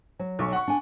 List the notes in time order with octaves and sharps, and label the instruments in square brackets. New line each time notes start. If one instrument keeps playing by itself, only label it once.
[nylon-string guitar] F#3
[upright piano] B1 C#6
F#5 C#6
[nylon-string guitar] D4 G#5